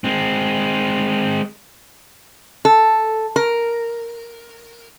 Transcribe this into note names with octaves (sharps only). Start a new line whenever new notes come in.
G#3 C4
A4
A#4